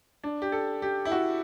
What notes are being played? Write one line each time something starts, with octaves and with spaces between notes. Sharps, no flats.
D4
G4
A4
G4
E4
F#4